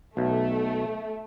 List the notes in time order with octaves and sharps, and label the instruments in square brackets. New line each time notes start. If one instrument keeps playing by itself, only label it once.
[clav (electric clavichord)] B1 [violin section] A3